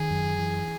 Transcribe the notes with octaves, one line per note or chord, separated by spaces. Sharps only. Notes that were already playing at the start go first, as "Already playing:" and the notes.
Already playing: D#3 G#4
F#2
E3